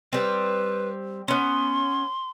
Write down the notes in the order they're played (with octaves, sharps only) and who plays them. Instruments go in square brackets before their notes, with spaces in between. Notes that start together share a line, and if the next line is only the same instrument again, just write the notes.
[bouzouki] G3 C4 [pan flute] B4
[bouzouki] B3 C#4 [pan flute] C6